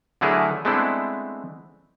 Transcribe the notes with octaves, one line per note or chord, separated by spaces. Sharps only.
D3 F#3 A3 E4 G#4 A#4
G#3 A3 B3 C4 D4 E4